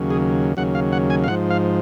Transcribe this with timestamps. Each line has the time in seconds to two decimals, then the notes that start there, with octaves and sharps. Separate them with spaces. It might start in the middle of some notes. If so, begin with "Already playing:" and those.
Already playing: D#2 C#3 F#3
0.10 G#4
0.57 D#2 C#3 F#3 F#5
0.75 F5
0.92 F#5
1.10 G#5
1.24 F5
1.28 G#2 F3 F#5
1.50 F5